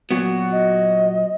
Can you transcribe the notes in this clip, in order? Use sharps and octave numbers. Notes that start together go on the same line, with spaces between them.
A#2 F#3 B3 F#4
D#5